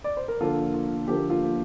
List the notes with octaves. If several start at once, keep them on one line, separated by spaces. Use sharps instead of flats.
D5
C5
A#4
D3 F3 A#3 F4 A4
F4
D3 F3 A#3 G4
F4